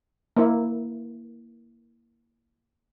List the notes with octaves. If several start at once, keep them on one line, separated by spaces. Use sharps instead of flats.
A#3 E4